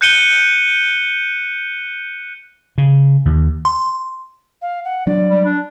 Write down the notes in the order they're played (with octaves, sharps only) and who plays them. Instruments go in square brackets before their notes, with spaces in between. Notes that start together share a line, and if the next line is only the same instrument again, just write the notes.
[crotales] F#6 G6 C#7 D#7 G7
[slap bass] C#3
D#2
[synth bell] C6
[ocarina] F5
F#5
[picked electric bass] F#3 D4 [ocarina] D5
[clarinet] G3
D4